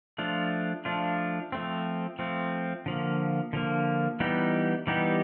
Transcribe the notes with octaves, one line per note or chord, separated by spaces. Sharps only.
F3 A3 D4 F4
F3 A3 D4 F4
F3 A3 C4
F3 A3 C4
D3 F3 A#3
D3 F3 A#3
E3 G3 B3 D#4 G4
E3 G3 B3 D#4 G4